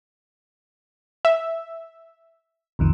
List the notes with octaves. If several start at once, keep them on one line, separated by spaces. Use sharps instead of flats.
E5
B1 F2 D#3